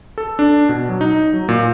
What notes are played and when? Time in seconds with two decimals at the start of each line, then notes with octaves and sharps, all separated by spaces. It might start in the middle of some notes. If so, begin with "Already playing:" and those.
0.18 A4
0.39 D4
0.69 B2
0.89 F#3
1.01 D#4
1.33 F#3
1.49 A#2